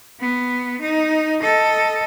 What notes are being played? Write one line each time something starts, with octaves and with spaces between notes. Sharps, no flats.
B3
D#4
A4 D#5